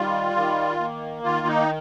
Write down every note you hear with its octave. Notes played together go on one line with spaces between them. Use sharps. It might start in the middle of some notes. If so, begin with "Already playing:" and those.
Already playing: D#3 G3 F4
D#3
A#3
D#3 F4
D#4